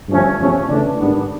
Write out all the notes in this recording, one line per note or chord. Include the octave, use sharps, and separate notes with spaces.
G2 D3 F3 A3 C#4
E2 C3 F3 A3 C#4
C#3 E3 A3 D4
G#2 D#3 G3 B3 D4